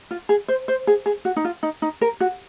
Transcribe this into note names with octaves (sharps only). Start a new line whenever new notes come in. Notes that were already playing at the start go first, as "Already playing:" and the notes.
F4
G#4
C5
C5
G#4
G#4
F#4
D#4
F4
D#4
D#4
A#4
F#4